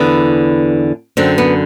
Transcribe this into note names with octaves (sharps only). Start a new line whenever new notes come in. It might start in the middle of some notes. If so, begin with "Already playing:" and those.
Already playing: E2 D3 B3
F#2 D3 C4
B3